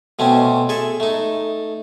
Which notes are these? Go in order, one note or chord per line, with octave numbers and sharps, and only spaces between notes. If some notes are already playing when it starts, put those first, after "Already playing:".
B2 A3 C4 C#4
G#4 A4 E5
A3 D#4